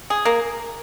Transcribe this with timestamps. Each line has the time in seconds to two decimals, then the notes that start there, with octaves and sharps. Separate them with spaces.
0.10 G#4
0.25 A#3